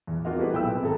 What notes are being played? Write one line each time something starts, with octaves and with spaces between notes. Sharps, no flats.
E2
A#3 C4 F4 F#4 D#5 F5
G3 A3 B3 E4 G4 B4
B1 G5 B5 E6
C4
G#1 A4 A#5